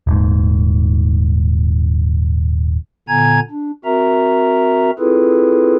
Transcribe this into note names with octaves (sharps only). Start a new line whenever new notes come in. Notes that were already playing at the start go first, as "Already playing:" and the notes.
D#1 G#2
A#2 D3 B3 G#5 A#5 G#6
D4
C4 F#4 A#4 E5 A#5
C4 E4 F4 G#4 A4 B4